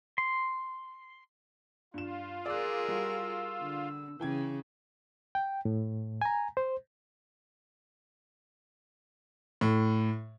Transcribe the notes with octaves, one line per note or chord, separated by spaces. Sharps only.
C6
G2 F4 E7
G#4 A#4 D5 E6 F#6
G3 F#4
D3
C#3 E3 G5 G#6
G5
A2
G#5 A#5
C5
A2